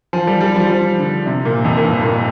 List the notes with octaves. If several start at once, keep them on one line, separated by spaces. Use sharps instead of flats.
F3
G3
G3
F3
F3
D3
C3
A#2
F2
A#2
G2
A#2